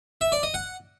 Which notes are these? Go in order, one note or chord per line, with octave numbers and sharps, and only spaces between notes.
E5
D5
D#5
F#5